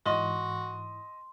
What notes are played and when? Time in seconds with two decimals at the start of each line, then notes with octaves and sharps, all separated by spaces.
0.06 G#2 E3 F#4 D#5 C6